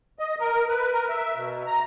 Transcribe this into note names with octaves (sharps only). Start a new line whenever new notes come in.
D#5
A#4
B4
A#4
E5
B2
A#5